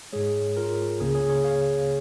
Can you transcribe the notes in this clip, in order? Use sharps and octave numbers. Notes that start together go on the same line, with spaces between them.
G#2 G#3 G#4 C#5
F4 A#4
C#2 C#3 A#3 G#4
G#4 C#5
G#4 C#5
C#5 F5